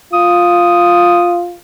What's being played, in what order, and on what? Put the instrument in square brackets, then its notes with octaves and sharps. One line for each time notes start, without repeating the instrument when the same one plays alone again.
[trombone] F4 [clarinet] D#6